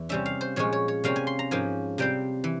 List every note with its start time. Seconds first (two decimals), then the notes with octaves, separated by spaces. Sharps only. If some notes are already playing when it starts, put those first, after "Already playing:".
Already playing: E2 E3
0.09 C3 G3 C#4 E5
0.26 F5
0.41 C5
0.56 A#2 F3 G#3 C#4 C#5
0.73 C#5
0.88 C#5
1.04 C3 G3 A#3 C#4 F5
1.16 G#5
1.27 C6
1.39 A#5
1.51 G#2 F3 A#3 C#4 G#5
1.98 C3 G3 C4 G5
2.44 E3